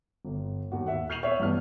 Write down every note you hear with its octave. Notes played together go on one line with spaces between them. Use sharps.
G1
D#2 F#4
E5 F#5
F6 G6 C7 D#7 F7 F#7
C#5 E5
A1 G2 B3 F6